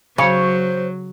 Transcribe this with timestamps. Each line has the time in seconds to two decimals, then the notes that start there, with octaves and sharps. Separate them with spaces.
0.18 C#3 F#3 C5 C#5